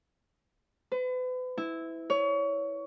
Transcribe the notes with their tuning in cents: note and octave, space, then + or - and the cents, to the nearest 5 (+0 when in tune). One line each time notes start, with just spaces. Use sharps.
B4 +40
E4 -10
C#5 +25